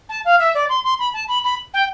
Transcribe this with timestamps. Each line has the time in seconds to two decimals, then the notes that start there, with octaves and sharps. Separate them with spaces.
0.09 A5
0.24 F5
0.39 E5
0.54 D5
0.69 C6
0.83 C6
0.98 B5
1.13 A5
1.28 B5
1.43 B5
1.73 G5